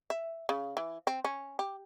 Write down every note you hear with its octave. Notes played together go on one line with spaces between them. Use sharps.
E5
C#3
E3
C4
C#4
G4